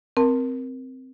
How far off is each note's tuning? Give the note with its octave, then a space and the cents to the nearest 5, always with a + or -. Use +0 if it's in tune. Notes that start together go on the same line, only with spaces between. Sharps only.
C4 -10 A#4 +15 A5 +20